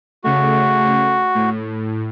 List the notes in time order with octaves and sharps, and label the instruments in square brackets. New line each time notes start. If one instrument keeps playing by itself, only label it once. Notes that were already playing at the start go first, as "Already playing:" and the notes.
[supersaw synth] C#3 A3 [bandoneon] F#4
[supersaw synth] A2